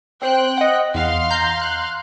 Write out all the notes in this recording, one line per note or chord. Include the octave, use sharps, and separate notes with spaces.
C4 C5 G5 F#6
D#5 F#5
E2 F5 C6 F6
A#5 G6
F#6